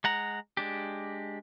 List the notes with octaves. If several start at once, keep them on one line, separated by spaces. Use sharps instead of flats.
G#3 F#5 A#5
G#3 D4 G4